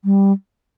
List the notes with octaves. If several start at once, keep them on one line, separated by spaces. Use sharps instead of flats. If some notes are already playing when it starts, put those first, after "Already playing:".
G3